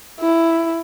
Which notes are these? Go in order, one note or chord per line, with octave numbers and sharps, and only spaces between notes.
E4